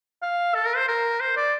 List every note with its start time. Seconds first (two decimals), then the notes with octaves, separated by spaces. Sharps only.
0.22 F5
0.55 A4
0.66 A#4
0.76 C5
0.88 A#4
1.20 C5
1.37 D5